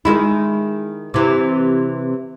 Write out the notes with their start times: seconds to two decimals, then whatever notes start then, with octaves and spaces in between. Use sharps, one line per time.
0.05 D#3 G#3 E4
1.14 C3 E3